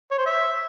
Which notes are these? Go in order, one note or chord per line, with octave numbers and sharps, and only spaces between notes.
C#5
C5
E5